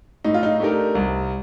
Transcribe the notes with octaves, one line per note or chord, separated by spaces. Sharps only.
A2 D#4
F4
D#4
A3 D4 G4 A#4
C2